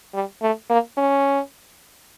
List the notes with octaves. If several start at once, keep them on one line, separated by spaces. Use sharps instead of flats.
G3
A3
A#3
C#4